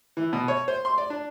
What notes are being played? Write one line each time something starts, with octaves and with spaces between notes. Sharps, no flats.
E3
B2
C#5
C5
C6
D5
D4